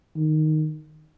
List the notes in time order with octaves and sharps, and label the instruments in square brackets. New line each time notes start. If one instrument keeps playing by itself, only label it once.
[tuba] D#3